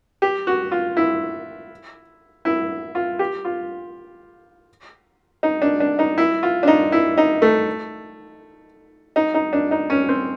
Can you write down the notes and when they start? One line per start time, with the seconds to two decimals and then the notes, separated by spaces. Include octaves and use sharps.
0.22 G4
0.47 F#4
0.72 F4
0.97 E4
2.45 E4
2.95 F4
3.19 G4
3.45 F4
5.43 D#4
5.62 D4
5.80 D4
5.99 D#4
6.18 E4
6.43 F4
6.63 D4
6.67 D#4
6.92 E4
7.18 D#4
7.42 A3
9.16 D#4
9.34 D#4
9.53 D4
9.71 D#4
9.90 C#4
10.09 C4